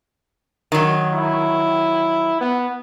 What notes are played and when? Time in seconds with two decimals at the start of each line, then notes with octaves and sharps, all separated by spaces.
0.72 D#3 F#3
1.13 E4
2.41 B3